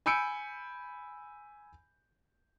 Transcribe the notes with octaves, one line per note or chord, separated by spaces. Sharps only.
G#5 B5 E6 G6 C#7 D7